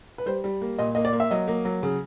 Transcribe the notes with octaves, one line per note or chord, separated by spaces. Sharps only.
B4
G3 C5
G3
A#3
A#2 D#5
A#3 D#5
D5
A#3
E5
F#3 D#5
A#3
F#3
C#3